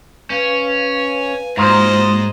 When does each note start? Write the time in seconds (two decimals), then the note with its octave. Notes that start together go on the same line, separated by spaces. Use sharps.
0.30 C#4 B4 F5
0.95 G#5
1.57 G#2 G#3 A#3 D#4 F4 F#4 C5 D#5